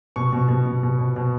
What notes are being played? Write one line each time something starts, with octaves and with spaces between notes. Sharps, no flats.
B2 C#6
B2
B2
B2
B2
B2
B2